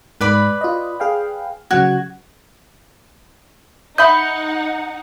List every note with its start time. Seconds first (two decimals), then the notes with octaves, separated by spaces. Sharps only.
0.21 G#2 B4 D5 B5
0.61 F4 D#5
1.00 G#4 F5 G5
1.71 C#3 F#3 F#4 G#6
3.98 D#4 D#5 E5 F#5 B5 G6